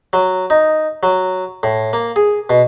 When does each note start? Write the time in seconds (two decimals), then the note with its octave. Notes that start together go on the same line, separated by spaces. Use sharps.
0.13 F#3
0.50 D#4
1.03 F#3
1.63 A2
1.93 A#3
2.16 G#4
2.50 B2